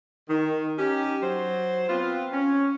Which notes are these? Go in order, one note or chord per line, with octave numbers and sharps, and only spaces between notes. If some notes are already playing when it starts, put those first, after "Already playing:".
D#3
C#4 D#4 G4
F#3 C5
B3 C4 F4
C#4